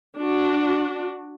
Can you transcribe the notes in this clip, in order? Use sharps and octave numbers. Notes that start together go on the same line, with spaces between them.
D4 F#4